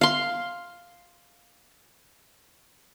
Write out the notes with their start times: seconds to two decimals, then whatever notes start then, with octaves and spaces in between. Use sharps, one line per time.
0.01 F5 C6